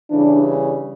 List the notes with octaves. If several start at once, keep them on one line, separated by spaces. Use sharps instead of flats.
C#3 E3 G3 D4